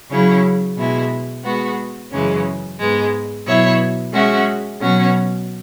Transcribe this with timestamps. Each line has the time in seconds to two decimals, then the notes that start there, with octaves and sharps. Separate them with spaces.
0.10 C#3 F#3 C#4 E4 C#5
0.77 B2 G#3 E4
1.44 G#3 B3 F#4
2.11 F#2 C#3 E3 G#3 C#4
2.79 G#2 G#3 B3
3.46 B2 F#3 E4 C#5 E5
4.13 G#3 C#4 F#4 E5
4.80 B2 F#3 C#4 F#4 C#5